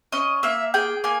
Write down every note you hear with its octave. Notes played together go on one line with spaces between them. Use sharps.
C#4 D#5
A#3 E5
G#4 G5
A#3 G#5